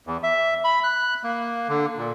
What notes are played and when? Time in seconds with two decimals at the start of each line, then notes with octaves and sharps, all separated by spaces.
0.07 E2
0.23 E5
0.64 B5
0.84 F#6
1.24 A#3
1.68 D3
1.97 A#2